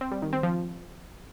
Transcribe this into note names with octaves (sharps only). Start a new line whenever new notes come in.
C4
G3
D#3
C4
F3